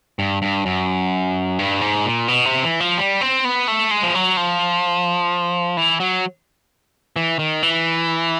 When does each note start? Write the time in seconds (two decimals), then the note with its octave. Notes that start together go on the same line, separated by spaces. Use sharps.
0.19 G2
0.42 G2
0.66 F#2
1.59 G2
1.81 G#2
2.05 A#2
2.28 B2
2.45 C3
2.63 E3
2.80 F3
2.98 G3
3.21 C4
3.45 B3
3.68 A3
3.91 G#3
4.03 F3
4.15 F#3
4.37 F3
5.77 E3
6.00 F#3
7.16 E3
7.39 D#3
7.63 E3